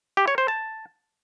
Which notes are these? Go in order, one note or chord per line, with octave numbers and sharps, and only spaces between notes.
G4
C#5
C5
A5